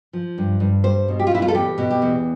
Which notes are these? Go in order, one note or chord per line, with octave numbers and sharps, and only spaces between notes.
F3
G2
G2
G3 C5
B2
G4
F4
B2 E4
F4
A4
E2 G4
B2
G4
E2